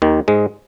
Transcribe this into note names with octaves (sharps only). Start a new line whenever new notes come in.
D#2 D#3
G#2 G#3